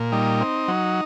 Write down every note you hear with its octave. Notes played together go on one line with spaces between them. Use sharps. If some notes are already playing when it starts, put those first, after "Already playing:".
Already playing: A#2
G3 D#4
C4
F#3